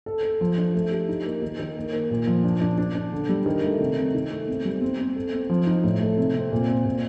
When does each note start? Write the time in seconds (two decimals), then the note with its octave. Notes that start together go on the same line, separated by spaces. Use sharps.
0.06 A4
0.23 A4
0.41 F3
0.58 D4
0.74 A3
0.91 G4
1.09 D#4
1.26 A#3
1.42 D#3
1.60 D#3
1.76 A#3
1.93 A#3
2.11 A#2
2.27 F3
2.44 D4
2.61 D4
2.78 D4
2.95 D4
3.12 D3
3.29 G3
3.46 D#3
3.63 A3
3.80 C3
3.98 C3
4.14 D#4
4.31 A3
4.48 C4
4.65 G3
4.81 C4
4.99 C4
5.16 A4
5.33 C4
5.50 F3
5.67 D#4
5.84 A2
6.01 A3
6.17 C3
6.35 C4
6.52 A#2
6.69 C4
6.86 A#2